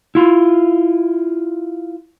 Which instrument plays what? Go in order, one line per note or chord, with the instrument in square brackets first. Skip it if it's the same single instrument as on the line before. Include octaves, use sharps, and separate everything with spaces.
[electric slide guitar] E4 F4